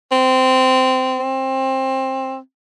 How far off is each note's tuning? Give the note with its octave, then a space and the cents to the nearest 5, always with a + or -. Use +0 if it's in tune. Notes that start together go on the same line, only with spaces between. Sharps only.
C4 -15
C4 +20